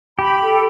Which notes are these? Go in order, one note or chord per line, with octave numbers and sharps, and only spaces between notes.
G4 B5
A4